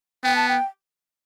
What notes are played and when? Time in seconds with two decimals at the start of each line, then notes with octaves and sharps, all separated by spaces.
0.24 B3 G5
0.36 A5
0.49 G5